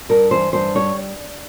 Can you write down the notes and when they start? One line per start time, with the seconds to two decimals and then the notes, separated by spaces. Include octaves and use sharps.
0.09 G2 A#4
0.31 E3 C5
0.53 G2 C5
0.75 G3 C#5